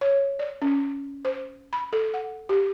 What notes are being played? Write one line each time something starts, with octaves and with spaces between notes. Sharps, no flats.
C#5
D5
C#4
C5
B5
A4
F#5
G4